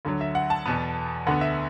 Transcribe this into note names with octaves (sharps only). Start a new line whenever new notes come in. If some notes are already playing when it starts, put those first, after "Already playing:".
D2 D3 F#3
E5
F#5
A5
E2 B2 B3
D2 D3 B3 F#5
E5